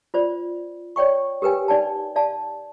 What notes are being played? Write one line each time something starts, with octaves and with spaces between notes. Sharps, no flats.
F4 C5 D5
C#5 D5 G5 C#6
G4 A#4 B4 G5 G#5
D#4 D5 G5 A5
D5 F5 A5